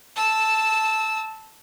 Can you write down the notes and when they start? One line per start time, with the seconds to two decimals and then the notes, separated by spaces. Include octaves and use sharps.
0.16 A5 E6